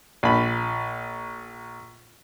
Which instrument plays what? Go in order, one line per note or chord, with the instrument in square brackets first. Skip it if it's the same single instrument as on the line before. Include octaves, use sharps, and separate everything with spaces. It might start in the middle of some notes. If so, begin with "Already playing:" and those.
[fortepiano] A#1 B5